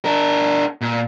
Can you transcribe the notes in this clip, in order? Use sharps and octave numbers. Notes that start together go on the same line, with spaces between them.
D4 A#4
A#2